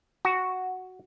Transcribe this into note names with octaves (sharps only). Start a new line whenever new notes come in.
F#4